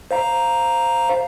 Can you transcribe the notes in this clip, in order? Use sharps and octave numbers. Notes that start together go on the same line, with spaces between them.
C5 F5 A#5